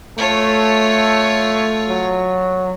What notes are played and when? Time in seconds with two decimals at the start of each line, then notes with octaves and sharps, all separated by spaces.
0.18 A3 F4 C#5
1.89 F#3